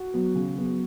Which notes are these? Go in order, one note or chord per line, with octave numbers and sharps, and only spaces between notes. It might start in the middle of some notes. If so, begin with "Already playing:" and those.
Already playing: F#4
F#3 B3
C#3
F#3 B3